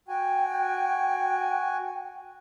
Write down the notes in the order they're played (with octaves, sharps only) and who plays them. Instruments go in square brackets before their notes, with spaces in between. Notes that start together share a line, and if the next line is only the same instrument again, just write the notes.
[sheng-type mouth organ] F#4 G#5 [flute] G5